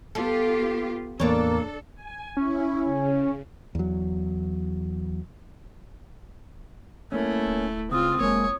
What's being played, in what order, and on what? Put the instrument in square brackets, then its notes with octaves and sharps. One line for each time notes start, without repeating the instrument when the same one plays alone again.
[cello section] B3 F4 G4 [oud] A4
[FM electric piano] E2 A2 B3 [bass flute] A#3 [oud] D4 C#5 [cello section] A4
[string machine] G#5
[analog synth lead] C#4 [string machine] E4
[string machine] C#3
[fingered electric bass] E2 F#3
[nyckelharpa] A3 E4 [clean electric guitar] A#3 C#4
[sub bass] D1
[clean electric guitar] C#2 [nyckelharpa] C4 F4 [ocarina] D#6
[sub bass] F1 [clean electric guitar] G#3 A#3 [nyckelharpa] C#5